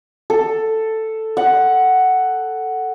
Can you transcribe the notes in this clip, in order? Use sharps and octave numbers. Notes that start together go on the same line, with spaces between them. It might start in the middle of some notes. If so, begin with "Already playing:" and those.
A4
F#5